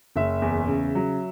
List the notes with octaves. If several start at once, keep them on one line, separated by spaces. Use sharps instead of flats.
F#1 E5
E2
C#3
F#3